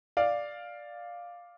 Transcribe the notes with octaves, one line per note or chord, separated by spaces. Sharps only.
D5 F5